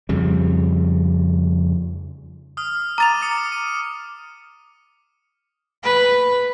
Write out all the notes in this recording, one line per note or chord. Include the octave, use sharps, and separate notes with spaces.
F2 C#3 G3
D#6 F6
A#5 D6 A6 D#7 F7
D6 D#6 C#7
D#7
B4